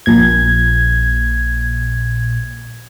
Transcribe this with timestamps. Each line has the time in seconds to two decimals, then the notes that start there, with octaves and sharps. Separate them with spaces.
0.06 A#1 A#2 G#6